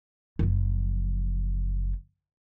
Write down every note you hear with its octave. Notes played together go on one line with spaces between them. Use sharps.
F#1 F3